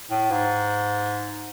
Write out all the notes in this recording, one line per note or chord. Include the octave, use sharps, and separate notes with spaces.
A2
G#2